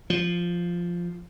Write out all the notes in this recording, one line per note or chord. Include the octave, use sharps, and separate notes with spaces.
F3